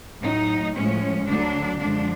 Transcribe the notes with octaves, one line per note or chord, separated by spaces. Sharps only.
A2 F#3 D#4
A2 F3 G#3 C#4
D2 D3 F#3 D4
F#2 D3 F3 G#3 D4